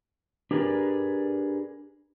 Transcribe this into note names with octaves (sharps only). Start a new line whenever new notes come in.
D4 G4 G#4 A#4 B4 D5